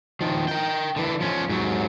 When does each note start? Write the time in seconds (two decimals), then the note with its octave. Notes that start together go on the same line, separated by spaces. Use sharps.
0.21 D#3 F3
0.48 A#4 G5
0.96 D3 E3
1.20 F3 C#4
1.49 G#2 F#3